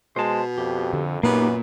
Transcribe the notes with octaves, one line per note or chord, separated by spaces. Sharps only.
B2 G#3 C5 A5
F2 G4
D3
F#2 A#2 A#3 B3 D#4 G4